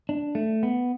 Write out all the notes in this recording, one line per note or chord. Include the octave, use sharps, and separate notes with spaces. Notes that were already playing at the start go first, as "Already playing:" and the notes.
D4
A3
B3